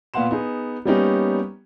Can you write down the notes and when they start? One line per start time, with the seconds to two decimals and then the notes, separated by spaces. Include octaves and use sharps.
0.14 A#2 B3 F5 F#5 C6 E7
0.31 B3 D#4 G#4
0.85 G3 A#3 B3 C#4 D#4 G4